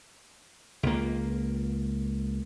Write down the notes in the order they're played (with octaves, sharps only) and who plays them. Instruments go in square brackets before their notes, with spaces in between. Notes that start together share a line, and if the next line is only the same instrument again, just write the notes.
[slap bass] C#2 A#3